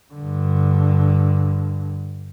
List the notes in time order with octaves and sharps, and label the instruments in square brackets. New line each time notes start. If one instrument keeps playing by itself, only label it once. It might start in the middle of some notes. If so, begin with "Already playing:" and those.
[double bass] G2 D3